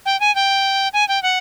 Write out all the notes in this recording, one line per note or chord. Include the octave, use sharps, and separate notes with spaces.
G5
G#5
G5
G#5
G5
F#5